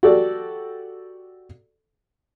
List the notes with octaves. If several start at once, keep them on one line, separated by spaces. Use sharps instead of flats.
F#4 G4 A4 D5